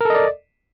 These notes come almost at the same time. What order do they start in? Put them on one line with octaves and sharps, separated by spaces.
A#4 A4 D#5 D5